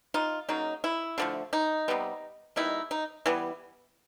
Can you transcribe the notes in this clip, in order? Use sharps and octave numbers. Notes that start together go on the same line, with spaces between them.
D#4 F4
C#3 F#3 A#3 D#4
E4
D3 F3 A3
D#4
C3 E3 G3 B3
B2 G3 A#3 D#4 E4
D#4
E3 G3 B3